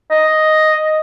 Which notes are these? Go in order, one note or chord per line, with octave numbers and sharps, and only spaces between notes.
D#5